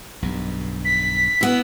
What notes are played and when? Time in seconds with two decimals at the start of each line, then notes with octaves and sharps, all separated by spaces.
0.22 B1 G2
0.85 B6
1.41 B3 E4